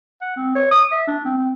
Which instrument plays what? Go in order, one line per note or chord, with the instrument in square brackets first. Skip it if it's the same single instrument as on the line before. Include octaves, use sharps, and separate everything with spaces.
[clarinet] F#5
C4
C#5
D#6
E5
D4
C4
C4